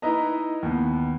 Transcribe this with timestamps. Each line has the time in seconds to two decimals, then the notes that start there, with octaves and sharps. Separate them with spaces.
0.02 D#4 E4 B4 D#5 A#5
0.63 D#2 B3